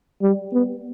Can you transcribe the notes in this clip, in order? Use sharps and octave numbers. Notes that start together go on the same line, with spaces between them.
G3
B3